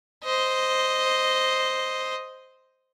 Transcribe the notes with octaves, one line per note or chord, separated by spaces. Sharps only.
C5 D#5